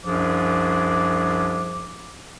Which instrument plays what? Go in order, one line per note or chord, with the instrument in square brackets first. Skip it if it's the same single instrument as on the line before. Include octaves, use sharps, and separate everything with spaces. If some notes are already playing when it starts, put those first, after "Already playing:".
[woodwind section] C2 F#2 F3 D4 G#4 D6